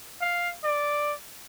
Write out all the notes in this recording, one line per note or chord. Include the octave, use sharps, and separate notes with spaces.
F5
D5